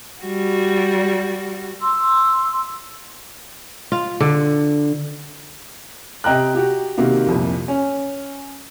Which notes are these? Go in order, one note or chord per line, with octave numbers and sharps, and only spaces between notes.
G3 F#4
C6 E6
F4
D3
C3 D#5 G5 A#5 F#6
F#4 G4
C3 D#3 A#3 F#4
C2 F2 A#2
C#4